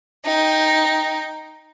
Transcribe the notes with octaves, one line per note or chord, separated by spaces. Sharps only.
D#4 G5